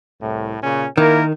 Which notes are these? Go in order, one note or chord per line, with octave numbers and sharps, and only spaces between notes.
C2 A2
A#2 C#3 C#4
D#3 A#3 E4 A#4